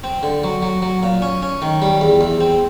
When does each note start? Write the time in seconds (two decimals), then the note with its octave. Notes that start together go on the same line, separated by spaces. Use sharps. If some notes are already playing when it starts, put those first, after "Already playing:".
0.04 C4
0.23 D3
0.44 F#3
0.62 F#3
0.82 F#3
1.03 A#2
1.22 C#4
1.42 C#4
1.62 D#3
1.82 G3
2.01 E2
2.21 E2
2.40 C4